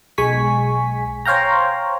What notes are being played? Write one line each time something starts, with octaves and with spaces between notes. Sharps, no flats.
B1 G#3 G#5 C#6 B6
C5 C#5 F5 G5 A#5